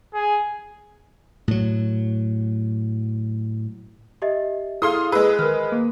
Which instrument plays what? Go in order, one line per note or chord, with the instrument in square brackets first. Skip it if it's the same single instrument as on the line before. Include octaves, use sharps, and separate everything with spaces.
[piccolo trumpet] G#4
[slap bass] A2 F#3
[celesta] G4 D#5 E5
[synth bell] E4 G#4 A4 [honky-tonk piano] F5 C6 D#6
[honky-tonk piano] G#3 B4 [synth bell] G#4 [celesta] E6
[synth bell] D#3 [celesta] A#4 F6
[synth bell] A#3